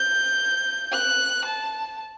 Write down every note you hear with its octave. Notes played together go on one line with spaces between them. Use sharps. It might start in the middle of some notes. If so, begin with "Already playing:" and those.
Already playing: G6
F#6
A5